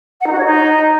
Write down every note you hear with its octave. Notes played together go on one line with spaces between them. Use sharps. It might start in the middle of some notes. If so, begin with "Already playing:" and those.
F#5
D#4
F#4
C#5
D#4